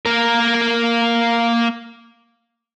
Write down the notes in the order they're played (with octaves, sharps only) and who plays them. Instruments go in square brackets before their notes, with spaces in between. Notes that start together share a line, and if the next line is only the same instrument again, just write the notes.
[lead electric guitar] A#3 A#4